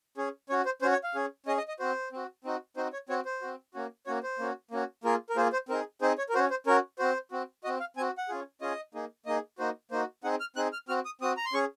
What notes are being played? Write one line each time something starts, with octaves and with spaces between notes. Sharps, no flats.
C#4 G#4
C#4 F#4 C#5
C5
C#4 F#4 C5
C#5
F5
C#4 G#4
C#4 G#4 D#5
D#5
D#5
C4 F#4 C5
C4 F#4
C4 D#4 F#4
C4 D#4 F#4 C5
C#5
C4 F#4 C#5
C5
C4 F#4
A#3 C#4 F#4
A#3 C#4 F#4 C#5
C5
A#3 C#4 F#4
A#3 C#4 F#4
A#3 F4 G#4 A#4
A#4
A#3 F4 G#4 C5
C5
C4 D#4 G#4 A#4
C4 D#4 G#4 C5
C#5
A#4
C#4 F#4 C5
C5
C#4 F#4 A#4
C4 F#4 C5
C4 F#4
C4 F#4 D#5
F5
C4 F#4 G#5
F#5
C#4 F4 G#4
C#4 F4 G#4 D#5
A#3 D#4 G#4
A#3 D#4 G#4 D#5
A#3 D#4 F#4 C5
A#3 D#4 F#4 C5
C4 D#4 G#4 F#5
F6
C4 D#4 G#4 F#6
F6
C4 F#4 F6
D#6
C4 F#4 D#6
A#5
C6
C#4 G#4 C#6